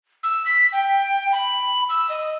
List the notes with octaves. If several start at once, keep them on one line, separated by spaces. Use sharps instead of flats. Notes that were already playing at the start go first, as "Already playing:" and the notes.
E6
B6
G5
B5
E6
D#5